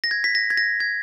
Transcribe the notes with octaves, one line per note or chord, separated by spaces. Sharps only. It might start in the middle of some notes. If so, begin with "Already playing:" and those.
A#6
G#6
B6
A#6
G#6
A#6
G#6